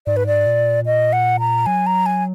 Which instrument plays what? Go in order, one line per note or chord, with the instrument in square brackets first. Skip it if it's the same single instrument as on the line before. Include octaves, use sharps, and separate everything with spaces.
[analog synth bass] G#2 [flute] D5
[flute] B4
D5
[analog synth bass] A#2
[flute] D#5
F#5
A#5
[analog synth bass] F#3 [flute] G#5
[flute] A#5
G#5